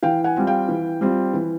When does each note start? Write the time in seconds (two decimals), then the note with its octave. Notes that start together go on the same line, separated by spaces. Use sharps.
0.03 E3 F5 G5
0.24 F#5 G#5
0.36 G3 C4 F4
0.47 F5 G5
0.69 E3
1.01 G3 C4 F4
1.33 E3